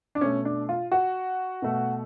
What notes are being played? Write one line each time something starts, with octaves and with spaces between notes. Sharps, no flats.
D4
B2 A3 C#4
D4
F4
F#4
B2 A3